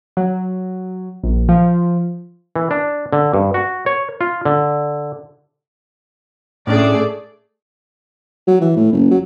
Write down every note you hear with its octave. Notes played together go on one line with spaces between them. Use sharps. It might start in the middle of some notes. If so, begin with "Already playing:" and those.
F#3
A#1
F3
E3
D4
D3
G2
F#4
C#5
F4
D3
A2 A3 C#4 D4 G#4 D5
F#3
E3
A2
F#1
F#3